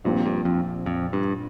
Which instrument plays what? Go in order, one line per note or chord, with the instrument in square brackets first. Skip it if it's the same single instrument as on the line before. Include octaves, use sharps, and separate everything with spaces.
[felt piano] A#1 A#2 F3 C4 [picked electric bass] G2
[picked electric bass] G2
F2
F2
G2